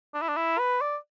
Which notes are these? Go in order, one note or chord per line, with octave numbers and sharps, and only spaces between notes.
D4
E4
D4
E4
B4
D5